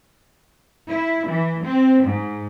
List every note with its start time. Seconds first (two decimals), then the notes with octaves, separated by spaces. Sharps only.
0.89 E4
1.27 E3
1.64 C4
2.03 G#2